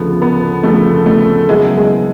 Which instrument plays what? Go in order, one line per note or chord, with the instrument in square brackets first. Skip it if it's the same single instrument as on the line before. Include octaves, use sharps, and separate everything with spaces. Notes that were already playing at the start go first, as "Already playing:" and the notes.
Already playing: [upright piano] D2 C#3 F3 [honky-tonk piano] B3
[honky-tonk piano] B3
[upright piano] D2 C#3 F3 [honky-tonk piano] A3
[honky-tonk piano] A3
[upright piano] C#3 F#3 B3 E4 [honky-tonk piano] G#3
[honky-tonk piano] G#3